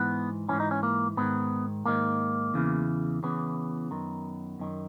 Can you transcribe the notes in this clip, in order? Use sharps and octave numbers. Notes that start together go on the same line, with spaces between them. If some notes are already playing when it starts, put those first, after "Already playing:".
Already playing: G#2 E3 B3
G#2 E3 C#4
D#4
C#4
A#3
G#2 D#3 B3
G#2 D#3 A#3
E2 C#3 E3
E2 C#3 E3 B3
F#2 D#3
F#2 D#3